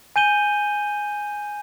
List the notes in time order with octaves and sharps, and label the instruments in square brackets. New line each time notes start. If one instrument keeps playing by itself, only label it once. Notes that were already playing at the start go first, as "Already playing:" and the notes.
[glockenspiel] G#5 G6 D#7 G7